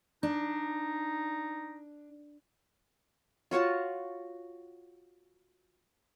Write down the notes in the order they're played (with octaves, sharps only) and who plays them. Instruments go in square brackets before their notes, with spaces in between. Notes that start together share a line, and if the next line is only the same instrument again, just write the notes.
[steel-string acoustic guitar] D4 [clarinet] D#4
[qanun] F4 F#4 C#5 A5